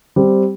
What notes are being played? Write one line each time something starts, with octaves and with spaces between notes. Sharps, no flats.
G3 C4 G4